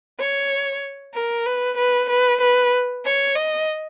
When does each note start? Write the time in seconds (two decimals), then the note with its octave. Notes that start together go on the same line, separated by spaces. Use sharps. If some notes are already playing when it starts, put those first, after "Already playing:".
0.19 C#5
1.14 A#4
1.46 B4
1.78 B4
2.10 B4
2.41 B4
3.05 C#5
3.36 D#5